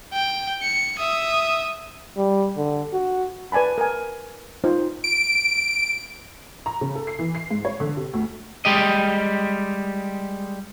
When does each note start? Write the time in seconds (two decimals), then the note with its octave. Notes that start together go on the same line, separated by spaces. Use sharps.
0.13 G5
0.62 C#7
0.98 E5 D#6
2.17 G3
2.57 D3
2.93 F#4
3.52 B4 D5 G#5 A5 B5
3.78 A#4 G#5
4.64 D#4 F4 C5
5.04 D7
6.66 A#5
6.81 C#3
6.95 A4
7.07 C7
7.19 E3
7.35 C7
7.50 G#2
7.65 C#5
7.80 D3
7.97 C3
8.13 D2
8.65 G3 G#3 G4 D#5